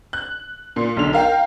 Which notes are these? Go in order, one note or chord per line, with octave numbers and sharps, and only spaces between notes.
F#6
A#2
B1 D3 F7
A#4 F5 G5